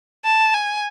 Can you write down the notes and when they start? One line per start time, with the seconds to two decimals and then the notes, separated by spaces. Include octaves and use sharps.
0.25 A5
0.54 G#5